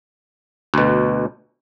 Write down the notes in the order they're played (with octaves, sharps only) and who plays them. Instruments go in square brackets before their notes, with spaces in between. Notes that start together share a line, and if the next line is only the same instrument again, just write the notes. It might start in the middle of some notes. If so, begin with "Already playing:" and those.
[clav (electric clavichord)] D2 B2